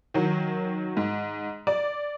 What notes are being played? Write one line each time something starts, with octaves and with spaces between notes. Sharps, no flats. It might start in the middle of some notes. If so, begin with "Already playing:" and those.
D#3 F#3
G#2
D5